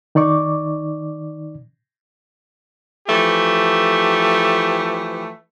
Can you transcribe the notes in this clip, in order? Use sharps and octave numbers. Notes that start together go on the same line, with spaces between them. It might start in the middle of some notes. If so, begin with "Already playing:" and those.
D#3 D#4 D5 C#6 D6
E3 F3 A3 G4